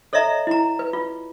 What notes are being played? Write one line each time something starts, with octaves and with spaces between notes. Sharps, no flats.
A4 C#5 D#5 E5 A#5
E4 A#5
B4
F4